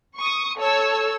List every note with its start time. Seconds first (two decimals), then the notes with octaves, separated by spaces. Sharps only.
0.17 C#6 D#6
0.60 A4 C#5 E6